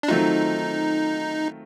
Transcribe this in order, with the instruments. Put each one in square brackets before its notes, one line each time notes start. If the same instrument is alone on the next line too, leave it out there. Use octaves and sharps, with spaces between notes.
[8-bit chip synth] D4
[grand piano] D#3 F#3 A3 C4 F4 [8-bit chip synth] D#4